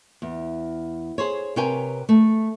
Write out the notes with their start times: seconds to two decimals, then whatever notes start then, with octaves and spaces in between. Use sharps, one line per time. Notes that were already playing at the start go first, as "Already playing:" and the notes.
0.22 E2
1.18 G#4 C5 C#5
1.56 C3 A#4 B4 C#5 G5 G#5
2.09 A3